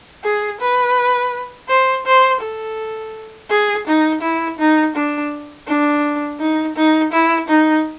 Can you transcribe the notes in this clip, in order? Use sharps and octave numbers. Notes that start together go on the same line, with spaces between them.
G#4
B4
C5
C5
A4
G#4
D#4
E4
D#4
D4
D4
D#4
D#4
E4
D#4